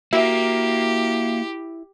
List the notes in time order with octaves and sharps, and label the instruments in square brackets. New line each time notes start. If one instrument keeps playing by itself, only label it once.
[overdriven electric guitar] A#3 [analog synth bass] E4 [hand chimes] F#4 E5 [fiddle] G4